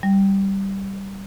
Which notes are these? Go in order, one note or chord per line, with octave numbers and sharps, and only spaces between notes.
G3